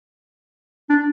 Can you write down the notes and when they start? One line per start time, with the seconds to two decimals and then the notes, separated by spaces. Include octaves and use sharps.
0.90 D4